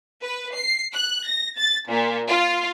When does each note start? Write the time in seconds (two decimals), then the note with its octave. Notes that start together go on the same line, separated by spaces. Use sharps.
0.24 B4
0.55 C7
0.93 F#6
1.26 A#6
1.57 A6
1.89 A#2
2.28 F4